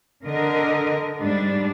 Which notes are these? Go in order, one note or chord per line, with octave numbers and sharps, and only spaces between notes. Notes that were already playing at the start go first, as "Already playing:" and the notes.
D3 A#4 D#5
G#2 G3 D4